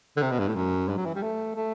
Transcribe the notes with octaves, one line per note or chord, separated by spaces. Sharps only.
D3
C3
B2
G2
A2
F#2
G2
F#3
E3
G3
A3
A3